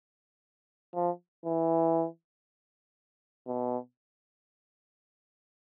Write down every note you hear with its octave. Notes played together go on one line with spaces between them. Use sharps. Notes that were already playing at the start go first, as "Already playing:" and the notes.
F3
E3
B2